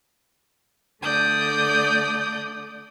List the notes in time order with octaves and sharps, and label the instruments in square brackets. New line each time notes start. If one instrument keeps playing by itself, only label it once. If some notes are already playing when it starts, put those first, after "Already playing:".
[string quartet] D3 A3 D5 D#6 G6